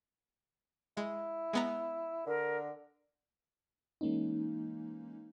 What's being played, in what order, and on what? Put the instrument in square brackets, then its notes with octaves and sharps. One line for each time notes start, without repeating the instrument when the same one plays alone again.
[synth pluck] G#3 [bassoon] E4
[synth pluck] G#3 B3 A#5
[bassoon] D3 [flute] A#4
[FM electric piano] E3 G#3 A#3 C#4 D#4